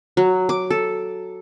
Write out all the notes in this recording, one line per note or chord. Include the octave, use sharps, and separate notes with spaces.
F#3
D6
A4